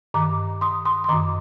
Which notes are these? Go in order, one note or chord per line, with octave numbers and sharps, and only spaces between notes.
G2 D#3 A#5 D6
C6 D#6
C6 D#6
C6
F#2 D#3 A#5 D6